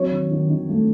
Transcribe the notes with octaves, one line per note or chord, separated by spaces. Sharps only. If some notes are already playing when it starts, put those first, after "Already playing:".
Already playing: F#3 C4 C#5
D#3
D#3
D#3
A3